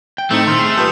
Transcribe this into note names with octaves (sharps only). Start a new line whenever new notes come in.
G5
A2 A3 C4 D#4 E6 C#7
A#2 D#3 C6 E6 F6 F7
G#4
G3 F4 A4 B4 D#6 E6 G6